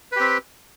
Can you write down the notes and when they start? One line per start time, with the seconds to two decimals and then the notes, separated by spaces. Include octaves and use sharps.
0.12 B4
0.16 G4
0.20 C4